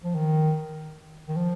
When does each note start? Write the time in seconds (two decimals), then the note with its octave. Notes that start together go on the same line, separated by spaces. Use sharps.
0.03 F3
0.15 D#3
1.28 D#3
1.36 F3